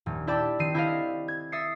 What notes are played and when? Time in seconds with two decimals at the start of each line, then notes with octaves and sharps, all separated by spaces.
0.06 D#1
0.27 E4 G4 D5 G5 A5 D6
0.59 D#3 C4 C7 D#7
0.74 E4 G4 A4 D5 D#5 F5
1.28 G#6
1.52 E5 D#6 A6 C7 C#7